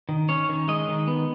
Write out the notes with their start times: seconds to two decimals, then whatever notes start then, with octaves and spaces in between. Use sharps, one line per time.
0.09 D#3
0.29 C#4 C#5
0.49 D#3
0.68 G#3 D#5
0.88 D#3
1.07 B3